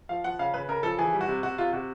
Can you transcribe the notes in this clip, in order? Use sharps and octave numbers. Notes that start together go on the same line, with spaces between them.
F3 F5
F3 F#5
C#3 F5
C#3 B4
C#3 A#4
F3 A4
E3 G#4
G3
F#4
C3
C3 F#4
C3 F4
C3 F#4